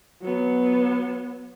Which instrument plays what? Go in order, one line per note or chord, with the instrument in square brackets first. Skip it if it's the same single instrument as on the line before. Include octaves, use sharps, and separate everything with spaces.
[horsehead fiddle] F#3 B3